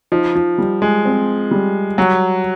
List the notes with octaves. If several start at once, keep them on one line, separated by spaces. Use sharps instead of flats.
F3 D#4
F3
G3
G#3
C4
G3
F#3 G3